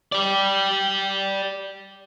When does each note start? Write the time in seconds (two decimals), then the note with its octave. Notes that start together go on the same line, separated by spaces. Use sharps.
0.12 G4 D5